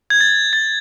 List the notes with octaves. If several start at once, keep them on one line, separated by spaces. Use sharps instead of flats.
G#6
A6
A6